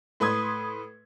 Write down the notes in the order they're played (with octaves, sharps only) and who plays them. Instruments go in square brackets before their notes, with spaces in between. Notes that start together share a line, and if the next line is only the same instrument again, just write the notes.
[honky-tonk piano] A2 B4 C6 D#6 G#6